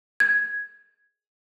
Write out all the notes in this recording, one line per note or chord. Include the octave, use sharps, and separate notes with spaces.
G#6